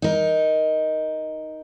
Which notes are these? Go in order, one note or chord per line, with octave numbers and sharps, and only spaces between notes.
D#4 A#4